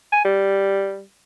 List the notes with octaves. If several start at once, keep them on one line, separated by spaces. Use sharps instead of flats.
G#5
G3